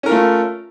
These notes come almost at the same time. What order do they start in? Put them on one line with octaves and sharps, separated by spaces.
C#4 A#4 F4 A3